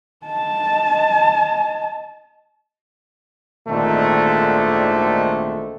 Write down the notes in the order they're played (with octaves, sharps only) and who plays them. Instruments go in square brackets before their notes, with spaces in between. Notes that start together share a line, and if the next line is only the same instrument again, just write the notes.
[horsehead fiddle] D#5 A5
[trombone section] G#1 A#2 D3 D#3 A3 C4